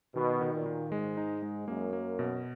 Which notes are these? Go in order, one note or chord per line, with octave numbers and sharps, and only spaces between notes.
B2 D#3
D#3
A#2
D#3
G#2 G#3
D#4
G#3
F#2 A#3
A#3
B2